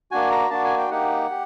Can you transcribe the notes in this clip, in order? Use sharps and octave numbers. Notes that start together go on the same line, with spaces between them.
A#3 D4 F#4 G#5
A#5
A#3 D4 F#4 A5
G#5
G5
A#3 D#4 G4 F#5
G4